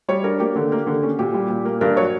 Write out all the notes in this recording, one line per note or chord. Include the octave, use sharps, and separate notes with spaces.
G3 C#5
D4 A#4
A#3 G4
D3
A#3
D3
C#4
A#2 G4
G3
A#2
A#3
G2 A#4
F#3 C#5